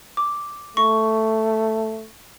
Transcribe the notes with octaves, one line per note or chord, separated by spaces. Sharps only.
D6
A3 C#6